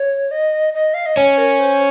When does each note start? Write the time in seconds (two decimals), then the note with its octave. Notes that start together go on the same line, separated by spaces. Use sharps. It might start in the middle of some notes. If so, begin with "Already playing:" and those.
Already playing: C#5
0.31 D#5
0.75 D#5
0.94 F5
1.06 D#5
1.16 C#4 C#5
1.38 A#4
1.59 C5